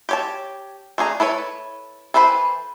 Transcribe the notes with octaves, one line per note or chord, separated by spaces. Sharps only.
G4 C#5 A5
A3 D4 G#4 A#5
E4 A4 B4 C#5
E3 A4 B4 C5 B5